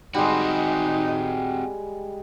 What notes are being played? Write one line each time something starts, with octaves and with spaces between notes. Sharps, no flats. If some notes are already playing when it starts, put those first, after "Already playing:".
G3 G#3 C4 D#4 F#4